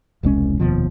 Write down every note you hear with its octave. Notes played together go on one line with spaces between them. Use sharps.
E1 C2 G#3 C#4
F1 D#2 B2 F3